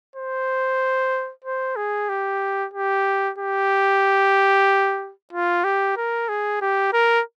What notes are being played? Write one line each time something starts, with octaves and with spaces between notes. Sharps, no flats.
C5
C5
G#4
G4
G4
G4
F4
G4
A#4
G#4
G4
A#4